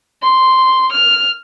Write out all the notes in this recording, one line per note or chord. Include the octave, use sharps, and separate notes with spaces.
C6
F6